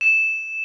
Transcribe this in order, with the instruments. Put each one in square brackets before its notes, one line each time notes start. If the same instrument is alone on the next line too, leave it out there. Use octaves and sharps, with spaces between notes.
[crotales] E7